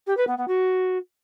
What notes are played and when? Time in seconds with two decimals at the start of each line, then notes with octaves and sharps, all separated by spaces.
0.07 G4
0.17 B4
0.27 B3
0.37 B3
0.48 F#4